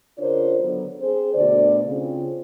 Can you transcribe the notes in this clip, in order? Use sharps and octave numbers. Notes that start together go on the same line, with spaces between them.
C#3 D4 F4 A#4 C5 C#5
D3 F#3 B3
C4 G#4 C5
D2 B2 D3 D4 D5
C#3 C4 F4